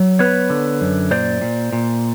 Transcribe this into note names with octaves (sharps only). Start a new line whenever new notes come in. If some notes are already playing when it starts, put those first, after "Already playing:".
Already playing: F#3
B3 B4 C#5
D3
F#2
A#2 C5 D5
A#2
A#2